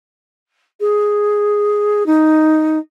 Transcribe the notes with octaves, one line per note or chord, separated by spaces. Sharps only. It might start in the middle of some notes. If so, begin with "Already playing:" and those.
G#4
D#4